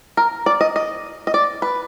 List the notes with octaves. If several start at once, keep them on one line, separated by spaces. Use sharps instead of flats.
A#4
D5
D#5
D#5
D#5
D5
B4